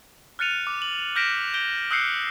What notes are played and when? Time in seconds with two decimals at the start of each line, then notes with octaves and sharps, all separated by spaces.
0.39 F6 F#6 A6 C#7 D#7 F7
0.67 D6
0.82 F#7
1.16 F6 G6 A#6 B6 D7 E7
1.54 G6 D7 G7
1.91 D#6 E6 F#6 G6 C7 C#7